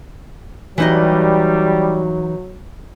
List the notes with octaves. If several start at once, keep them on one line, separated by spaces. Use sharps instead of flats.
E3 F#3 G3 D#4 D#5